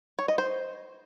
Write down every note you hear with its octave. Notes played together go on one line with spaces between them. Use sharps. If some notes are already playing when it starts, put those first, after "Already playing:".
C#5
D#5
C5